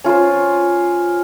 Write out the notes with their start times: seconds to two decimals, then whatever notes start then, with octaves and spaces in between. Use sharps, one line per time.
0.04 C#4 F4 C5